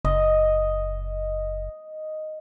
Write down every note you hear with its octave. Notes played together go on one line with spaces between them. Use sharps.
F#1 D#5